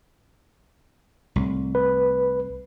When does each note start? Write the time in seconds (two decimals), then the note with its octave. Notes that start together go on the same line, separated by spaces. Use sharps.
1.36 C2 A2
1.75 B4